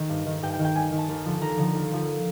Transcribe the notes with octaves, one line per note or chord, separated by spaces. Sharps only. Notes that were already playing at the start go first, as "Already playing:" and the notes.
Already playing: D#3
G2
D#3
G2 G5
G5
D#3
G5
G2 G#5
D#3
A5
D#2
D3 F3
D#2 A#5
D3 F3
D#2
D3 F3